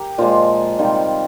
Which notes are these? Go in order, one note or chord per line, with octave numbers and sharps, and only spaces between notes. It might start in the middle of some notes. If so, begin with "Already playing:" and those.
Already playing: G4 A#4
A#2 F3 G#3 F4
C3 D#3 G3 F4